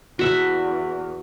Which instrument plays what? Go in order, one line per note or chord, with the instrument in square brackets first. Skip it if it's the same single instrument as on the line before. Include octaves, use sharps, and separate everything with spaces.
[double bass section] E2 [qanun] F#4 E5